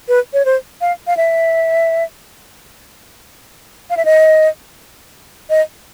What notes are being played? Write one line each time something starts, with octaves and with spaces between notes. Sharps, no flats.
B4
C#5
C5
F5
F5
E5
F5
E5
D#5
D#5